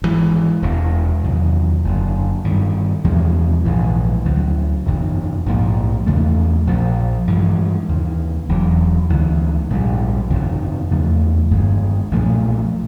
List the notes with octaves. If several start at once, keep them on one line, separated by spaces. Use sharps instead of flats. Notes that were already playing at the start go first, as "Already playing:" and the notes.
G#1 G#2 E3 G#3
E1 E2 C3 E3
E2 C3 D#3 F#3
F#1 F#2 D3
G2 D#3 G3
E2 C3 F3 G#3
A#1 G#2 E3
D2 C#3 F#3
G1 F2 C3 E3
A#1 G#2 F3 A#3
E2 C#3 F3 A3
A#1 A#2 F3
G2 E3 G#3
D#2 C#3 E3
E1 E2 C#3 F#3
D2 C#3 E3 G#3
A#1 G#2 E3 G3
G1 F2 C3 D#3
E2 C#3 F3 A3
G1 G2 D#3 G#3
B1 A#2 F3 A3